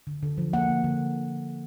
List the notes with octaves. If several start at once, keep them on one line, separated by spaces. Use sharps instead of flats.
D3
D3
F3
A#3 F#5
D3
D3